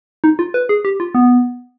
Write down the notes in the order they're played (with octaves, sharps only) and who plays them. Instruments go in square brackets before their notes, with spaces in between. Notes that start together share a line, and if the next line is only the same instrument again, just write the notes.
[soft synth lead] D#4
F4
B4
G#4
G4
F4
B3